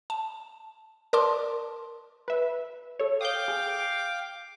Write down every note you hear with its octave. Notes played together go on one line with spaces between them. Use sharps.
A5
A#4 D5 A5 C6 D6
B4 E5
A4 C#5
F5 G5 D6 D#6 G6
G#4